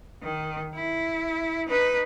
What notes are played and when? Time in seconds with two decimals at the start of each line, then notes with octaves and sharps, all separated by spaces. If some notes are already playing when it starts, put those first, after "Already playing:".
0.23 D#3
0.75 E4
1.68 D#4 B4